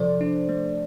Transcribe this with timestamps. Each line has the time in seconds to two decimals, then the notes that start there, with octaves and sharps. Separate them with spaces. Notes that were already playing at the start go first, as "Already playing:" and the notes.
Already playing: C3 F3 A4 C5 D5
0.21 D4
0.49 A3